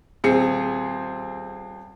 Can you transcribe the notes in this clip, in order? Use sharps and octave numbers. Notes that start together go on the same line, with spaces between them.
D#1 C4 G#4 C#7